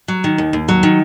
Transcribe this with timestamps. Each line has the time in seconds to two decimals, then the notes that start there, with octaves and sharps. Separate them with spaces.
0.08 F#3
0.24 D#3
0.38 D#2
0.53 D#2
0.68 F#3
0.83 D#3